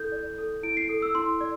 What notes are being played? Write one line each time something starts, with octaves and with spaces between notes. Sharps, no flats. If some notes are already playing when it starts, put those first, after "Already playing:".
Already playing: E4 A4 G6
D5
A4
E4 D7
C7
A4
E6
E4 C6
D5